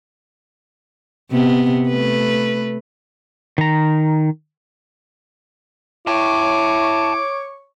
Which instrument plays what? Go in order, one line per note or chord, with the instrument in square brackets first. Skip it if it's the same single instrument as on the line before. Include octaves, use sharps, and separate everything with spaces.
[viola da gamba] C3 B3
A3 B4
[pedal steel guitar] D#3 A#5
[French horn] E4 [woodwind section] C#5 C#6 [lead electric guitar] G5 A5 [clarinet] D6